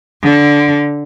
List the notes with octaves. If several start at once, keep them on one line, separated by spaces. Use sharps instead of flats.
D3